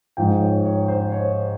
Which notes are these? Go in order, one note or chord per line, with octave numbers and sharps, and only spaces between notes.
G#2 F3 G5
C#5
C#5
C5
C#5